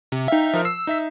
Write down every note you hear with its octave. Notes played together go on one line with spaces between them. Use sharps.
C3
D#4 E5 F5 G5
F3 A#4 F6
E6 C7
D#4 E5 B6